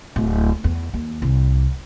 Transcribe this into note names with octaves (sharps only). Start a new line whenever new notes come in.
D1
E2
D#2
C2